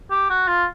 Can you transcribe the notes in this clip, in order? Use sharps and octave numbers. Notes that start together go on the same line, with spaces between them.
G4
F#4
F4